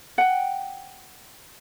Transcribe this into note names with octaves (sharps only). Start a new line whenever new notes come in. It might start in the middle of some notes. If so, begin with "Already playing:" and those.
F#5 G5